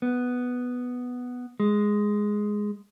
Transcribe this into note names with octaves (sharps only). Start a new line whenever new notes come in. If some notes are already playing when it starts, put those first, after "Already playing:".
B3
G#3